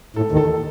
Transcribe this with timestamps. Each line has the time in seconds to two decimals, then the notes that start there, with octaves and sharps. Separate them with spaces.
0.16 A2 A4
0.32 D#2 D#3
0.37 A4